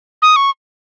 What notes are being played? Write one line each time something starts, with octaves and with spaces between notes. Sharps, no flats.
D#6
C#6